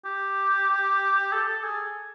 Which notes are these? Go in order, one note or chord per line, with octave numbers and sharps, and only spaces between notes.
G4
A4
A4
G#4